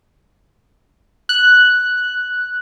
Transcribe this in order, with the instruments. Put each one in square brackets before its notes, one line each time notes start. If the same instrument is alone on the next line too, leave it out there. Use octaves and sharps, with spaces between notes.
[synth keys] F#6